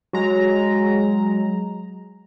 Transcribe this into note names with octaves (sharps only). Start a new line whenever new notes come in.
F#3 G#3 A#5